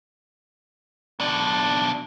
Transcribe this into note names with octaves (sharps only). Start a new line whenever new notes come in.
B2 D4